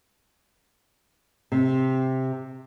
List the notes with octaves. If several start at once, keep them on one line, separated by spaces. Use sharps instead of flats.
C3